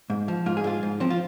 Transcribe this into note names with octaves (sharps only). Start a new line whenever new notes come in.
G#2
F3
G#2 F4
G#4
G#2 F4
G#2
F3 C4
F4